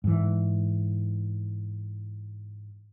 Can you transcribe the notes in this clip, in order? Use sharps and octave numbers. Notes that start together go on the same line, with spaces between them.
G#2 E3